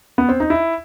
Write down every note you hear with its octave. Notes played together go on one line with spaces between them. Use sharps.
B3
C4
D#4
E4